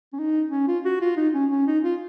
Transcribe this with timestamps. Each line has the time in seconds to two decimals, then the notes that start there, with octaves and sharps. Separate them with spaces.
0.13 C#4
0.19 D#4
0.52 C#4
0.68 F4
0.85 F#4
1.01 F4
1.17 D#4
1.34 C#4
1.51 C#4
1.67 D#4
1.84 F4